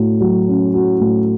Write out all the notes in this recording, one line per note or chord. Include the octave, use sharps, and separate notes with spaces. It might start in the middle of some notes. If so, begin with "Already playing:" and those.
Already playing: A2 F#4
F#3
C#4
F#4
A2